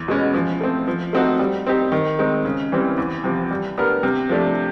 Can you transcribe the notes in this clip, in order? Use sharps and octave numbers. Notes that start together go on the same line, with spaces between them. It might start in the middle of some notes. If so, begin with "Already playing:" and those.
Already playing: E2
B2 G#3 C#4
F3
A3 C4
F3
A3 C4 D#4 F#4
G3
C4 D#4 G4
D#3
G#3 C4 D#4
C#3
E3 G3 C4
E2
C3 F3
G3
B3 D4 G4 A#4
C3
F3 A3 D4 G4